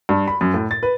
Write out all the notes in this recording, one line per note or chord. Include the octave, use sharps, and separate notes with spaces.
G2
B5
F#2
A2
A6
B4